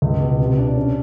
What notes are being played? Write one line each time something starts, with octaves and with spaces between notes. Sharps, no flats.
C#2
B2
C3
D4
C#4